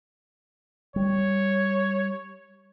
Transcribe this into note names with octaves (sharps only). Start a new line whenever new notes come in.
G3 C#5